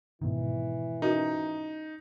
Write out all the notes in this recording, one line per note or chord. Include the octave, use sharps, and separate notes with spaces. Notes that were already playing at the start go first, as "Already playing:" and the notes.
G#2 B2 D#3 E3
C#4 D#4 F#4 A#4